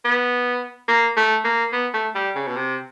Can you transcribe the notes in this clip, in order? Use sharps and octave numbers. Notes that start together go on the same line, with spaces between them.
B3
A#3
A3
A#3
B3
A3
G3
C#3
B2
C3